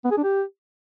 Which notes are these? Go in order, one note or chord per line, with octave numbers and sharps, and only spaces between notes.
B3
G#4
D4
G4